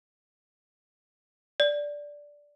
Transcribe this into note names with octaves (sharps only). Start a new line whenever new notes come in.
D5